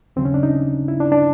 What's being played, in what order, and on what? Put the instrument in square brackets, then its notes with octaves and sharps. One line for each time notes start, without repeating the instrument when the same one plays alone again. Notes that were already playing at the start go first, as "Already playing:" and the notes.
[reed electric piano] D#2 C#3 F#3 C4
C#4
D4
D#4
E4
D4
D4